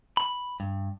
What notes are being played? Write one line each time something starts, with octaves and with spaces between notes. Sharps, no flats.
B5
G2